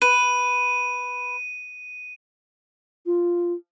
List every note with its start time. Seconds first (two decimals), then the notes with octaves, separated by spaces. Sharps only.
0.02 B4 D#7
3.06 F4